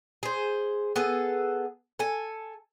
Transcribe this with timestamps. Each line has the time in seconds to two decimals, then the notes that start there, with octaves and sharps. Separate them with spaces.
0.23 G#4 C5
0.96 B3 G#4 A4
1.99 A4 G#5